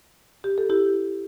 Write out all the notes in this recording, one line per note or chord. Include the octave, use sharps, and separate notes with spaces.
G4
A4
E4 G4